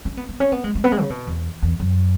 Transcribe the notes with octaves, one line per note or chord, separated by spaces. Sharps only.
C#4
B3
B3
C#4
B3
G#3
G#3
B3
G#3
C#3
B2
E2
E2
F#2